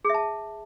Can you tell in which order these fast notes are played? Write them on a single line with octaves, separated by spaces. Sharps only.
G#4 E5 A5